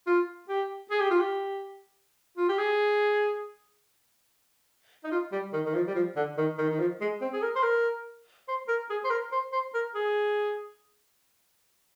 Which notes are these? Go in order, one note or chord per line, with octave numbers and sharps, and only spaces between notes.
F4
G4
G#4
G4
F4
G4
F4
G4
G#4
D#4
F4
G3
D#3
D#3
F3
G3
F3
D3
D#3
D#3
D#3
F3
G#3
C4
G#4
A#4
C5
A#4
C5
A#4
G#4
C5
A#4
C5
C5
A#4
G#4